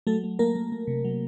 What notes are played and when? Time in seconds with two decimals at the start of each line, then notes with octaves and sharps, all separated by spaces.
0.07 F#3 A3 A4
0.24 A3
0.39 A3 A#3 A#4
0.55 A3
0.72 A3
0.87 C3
1.04 F#3